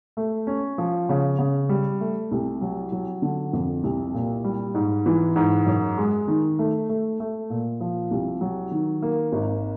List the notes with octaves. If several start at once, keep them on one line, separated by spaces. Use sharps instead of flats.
A3
C#4
F3
C#3
C#3
G3
A3
C2
F#3
F#3
D3
F2
C2
A#2
G3
G#2
E3
G#2
F#2
G#3
D#3
A3
A3
A3
A#2
F3
C2
F#3
D#3
A#3
G#1